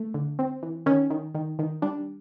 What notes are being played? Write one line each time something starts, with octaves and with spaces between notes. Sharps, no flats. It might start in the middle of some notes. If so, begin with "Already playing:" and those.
Already playing: A3
D3
C4
E3
D#3 C#4
D#3
D#3
D#3
G3 D4